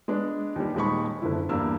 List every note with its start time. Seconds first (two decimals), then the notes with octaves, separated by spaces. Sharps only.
0.08 G#3 B3 D4
0.56 D#2 G3
0.75 D#1 D#2 G#3 B5 C#6
1.22 F#1 D3 E4
1.49 E2 G2 A#3 E6